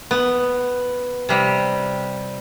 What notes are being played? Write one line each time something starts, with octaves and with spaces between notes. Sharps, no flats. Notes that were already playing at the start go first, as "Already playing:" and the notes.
B3
C3 G3